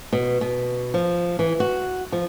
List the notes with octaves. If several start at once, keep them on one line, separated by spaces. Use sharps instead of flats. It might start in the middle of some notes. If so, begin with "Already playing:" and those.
B2
B2
F3
E3
F#4
F3